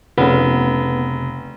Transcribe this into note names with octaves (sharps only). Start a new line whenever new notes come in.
F1 C#3 B3